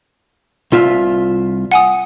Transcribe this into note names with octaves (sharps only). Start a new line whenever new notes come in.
C2 F4 E5
F#5 G#5 D#6